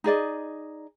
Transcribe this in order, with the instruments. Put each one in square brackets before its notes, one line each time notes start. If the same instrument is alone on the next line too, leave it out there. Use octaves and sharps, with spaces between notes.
[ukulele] D#4 G#4 D5 D#5